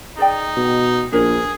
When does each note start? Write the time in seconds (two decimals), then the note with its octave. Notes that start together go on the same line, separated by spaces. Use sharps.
0.18 D#4 G#4 D5 G5
0.57 B2
1.12 A#1 G#4 A#4 C5 C#5